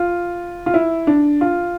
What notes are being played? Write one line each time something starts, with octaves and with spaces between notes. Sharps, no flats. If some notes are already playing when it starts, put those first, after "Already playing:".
Already playing: F4
F4
E4
D4
F4